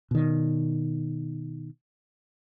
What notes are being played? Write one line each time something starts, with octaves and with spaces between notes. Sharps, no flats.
B2 D#3